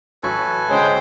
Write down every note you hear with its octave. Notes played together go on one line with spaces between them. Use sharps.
A1 F#3 A4 B4 G#5 C#6
D2 G#3 C#4 C5 G5